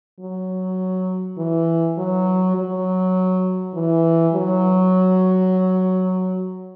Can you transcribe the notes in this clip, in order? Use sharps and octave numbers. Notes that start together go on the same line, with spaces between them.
F#3
E3
F#3
F#3
E3
F#3